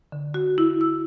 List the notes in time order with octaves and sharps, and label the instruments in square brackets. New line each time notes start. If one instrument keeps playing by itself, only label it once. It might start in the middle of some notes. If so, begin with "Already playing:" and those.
[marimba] D3
F#4
E4
E6